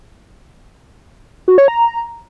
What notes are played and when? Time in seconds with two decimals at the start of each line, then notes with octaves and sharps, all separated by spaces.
1.48 F#4
1.58 C#5
1.68 A#5